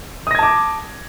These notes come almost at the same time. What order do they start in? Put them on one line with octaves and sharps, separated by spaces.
D#6 A#6 G#6 A5 D6